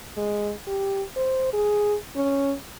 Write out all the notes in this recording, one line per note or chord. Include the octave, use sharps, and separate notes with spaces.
G#3
G4
C5
G#4
C#4